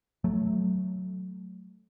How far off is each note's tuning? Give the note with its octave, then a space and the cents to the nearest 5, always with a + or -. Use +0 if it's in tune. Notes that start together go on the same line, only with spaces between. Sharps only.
F#3 +0 A3 -10